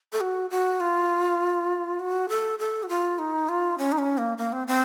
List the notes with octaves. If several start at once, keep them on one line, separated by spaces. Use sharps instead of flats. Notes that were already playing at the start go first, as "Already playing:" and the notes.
A4
F#4
F#4
F4
F#4
A4
A4
F#4
F4
D#4
F4
C#4
D#4
C#4
A#3
A#3
C4
C4